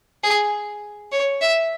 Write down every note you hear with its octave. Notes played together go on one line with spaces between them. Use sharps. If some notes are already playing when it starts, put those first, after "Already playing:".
G#4
C#5
E5